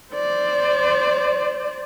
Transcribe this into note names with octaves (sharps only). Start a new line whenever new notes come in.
C5 D5